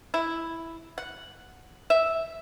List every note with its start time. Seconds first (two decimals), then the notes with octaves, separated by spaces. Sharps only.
0.14 E4
0.98 F#5
1.90 E5